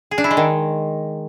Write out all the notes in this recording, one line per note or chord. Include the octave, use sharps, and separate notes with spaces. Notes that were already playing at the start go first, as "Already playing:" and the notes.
G#4
D4
E4
G#3
D#3